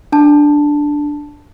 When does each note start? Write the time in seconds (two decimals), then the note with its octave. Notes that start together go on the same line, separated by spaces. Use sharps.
0.12 D4 A5